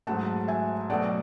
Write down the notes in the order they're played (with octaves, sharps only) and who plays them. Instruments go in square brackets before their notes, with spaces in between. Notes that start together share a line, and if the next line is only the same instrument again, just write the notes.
[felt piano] G#2 F#3 A3 F#5 A5
E5 G#5
B2 F#3 A3 D5 F#5